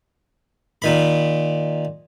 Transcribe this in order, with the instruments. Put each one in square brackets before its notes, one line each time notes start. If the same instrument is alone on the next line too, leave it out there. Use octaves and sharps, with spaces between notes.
[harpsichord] A#2 D#3 B5